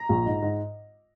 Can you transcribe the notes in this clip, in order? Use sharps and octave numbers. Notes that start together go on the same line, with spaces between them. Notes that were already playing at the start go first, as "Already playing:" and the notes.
Already playing: A#5
A#1
G#2
G#2